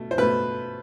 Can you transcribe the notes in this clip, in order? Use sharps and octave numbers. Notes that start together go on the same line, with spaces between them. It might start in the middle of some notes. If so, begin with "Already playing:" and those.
Already playing: B2 A3
C5
B2 A3 B4